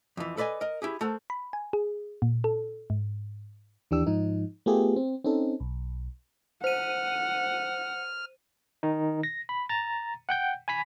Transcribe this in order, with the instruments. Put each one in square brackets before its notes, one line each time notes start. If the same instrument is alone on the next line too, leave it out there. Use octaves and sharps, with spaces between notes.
[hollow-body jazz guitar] F2 E3
A4 B4 D5 D#5 G#5
A#4 D#5
E4 G4 G#4
A3 A4 A#4 C5 F#5
[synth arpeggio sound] B5
G#5
G#4
A#2
A4
G#2
[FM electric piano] D#2 E3 D4 G4 E6
G#2 F3 D#4
A3 B3 F4 G4 G#4
C4
C4 C#4 D#4 A4
B1
[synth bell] C5 D#7 [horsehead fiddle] F#5 [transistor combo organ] F6
[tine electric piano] D#3 D#4
A#6
B5
A#5 A6
F#5 G5 G6
G#5 B5 B6